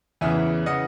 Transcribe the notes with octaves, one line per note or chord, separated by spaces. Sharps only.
E2 C#3 E3 E5 G#5
C#3 E3 D#5 F#5